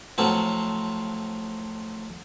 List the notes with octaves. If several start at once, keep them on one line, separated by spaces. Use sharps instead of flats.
A2 F3 F#3 C4 F4